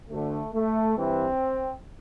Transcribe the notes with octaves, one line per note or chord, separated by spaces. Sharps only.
D2 D3 A3
A3
G2 E3 C4